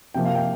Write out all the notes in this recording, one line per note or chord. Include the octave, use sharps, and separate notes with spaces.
C3 F3 A#3 G5
F5
G5